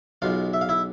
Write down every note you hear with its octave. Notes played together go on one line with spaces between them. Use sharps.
B1 B2 G#3 F4 F5
E5
F5
E4 E5